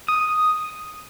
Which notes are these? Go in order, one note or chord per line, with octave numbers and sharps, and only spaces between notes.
D#6